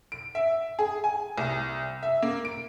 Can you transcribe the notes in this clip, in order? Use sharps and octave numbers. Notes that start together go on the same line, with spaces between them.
D7
E5
G#4
G#5
C2
E5
A#3
D7